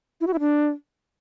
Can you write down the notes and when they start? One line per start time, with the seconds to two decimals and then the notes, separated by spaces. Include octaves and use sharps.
0.21 E4
0.27 F#4
0.33 E4
0.40 D4